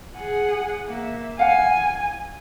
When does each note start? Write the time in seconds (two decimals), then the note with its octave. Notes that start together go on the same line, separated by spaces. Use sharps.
0.17 G#4 F#5
0.87 A#3 E5
1.39 F5 F#5 G#5